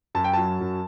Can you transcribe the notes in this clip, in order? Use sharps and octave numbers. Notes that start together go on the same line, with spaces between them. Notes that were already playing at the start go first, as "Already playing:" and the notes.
F#2 A5
G5
F#3 A5
F#2